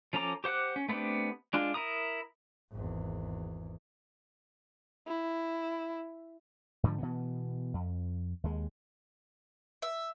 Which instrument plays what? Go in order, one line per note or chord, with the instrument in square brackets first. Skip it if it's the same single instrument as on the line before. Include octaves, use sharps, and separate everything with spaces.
[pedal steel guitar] F3 C#4 A4 A#5 D6
G4 C5 F#5 D6 F#6
C#4
A3 B3 C4 D4 G4
G#3 D4 F4
E4 A#4 A#5 D#6
[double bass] G#1 E2
[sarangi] E4
[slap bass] G#2 D3 E3 F3
B2 E3 B3
F2
D#2 G#3
[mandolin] E5